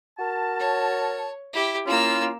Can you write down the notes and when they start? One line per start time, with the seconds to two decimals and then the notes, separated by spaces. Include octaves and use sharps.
0.19 F#4 A#4 A5
0.59 C#5
1.53 E4 G4
1.87 A#3 C#4 E4 F4 E6